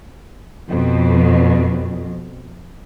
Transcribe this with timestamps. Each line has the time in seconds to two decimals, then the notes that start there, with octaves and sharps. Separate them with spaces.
0.70 F2 B2